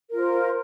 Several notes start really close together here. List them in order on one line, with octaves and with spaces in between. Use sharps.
A#4 F4 C5